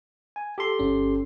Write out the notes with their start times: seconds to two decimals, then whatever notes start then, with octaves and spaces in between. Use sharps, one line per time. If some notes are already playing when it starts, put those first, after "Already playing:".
0.36 G#5
0.58 G4 A4 C6
0.79 G1 C#4